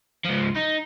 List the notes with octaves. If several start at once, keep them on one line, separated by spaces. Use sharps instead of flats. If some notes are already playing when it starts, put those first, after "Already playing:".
C#2 F3
D#4